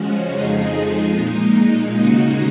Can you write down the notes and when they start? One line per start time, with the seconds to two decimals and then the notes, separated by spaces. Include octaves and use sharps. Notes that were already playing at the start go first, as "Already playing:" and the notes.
Already playing: C#3 F3 G#3 C#4 F#4
0.29 F2 F3 G#3 D#4 G#4
1.12 A#2 G#3 D#4
1.95 D#2 C#3 G#3 D#4 F#4